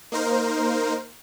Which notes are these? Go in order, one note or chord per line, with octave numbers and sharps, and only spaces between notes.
A#3 D#4 A#4 C5